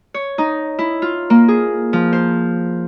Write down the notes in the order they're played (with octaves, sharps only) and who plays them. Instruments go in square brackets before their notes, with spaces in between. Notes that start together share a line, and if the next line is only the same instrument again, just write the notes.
[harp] C#5
D#4
E4
F4
A#3
G#4
F3
C5